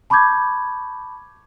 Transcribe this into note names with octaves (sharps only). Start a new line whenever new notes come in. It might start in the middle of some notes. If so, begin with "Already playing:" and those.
A5 B5 C#6 D6 G6 G#6